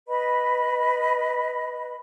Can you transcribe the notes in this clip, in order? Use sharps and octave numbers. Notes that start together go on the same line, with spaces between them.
B4 D#5 B5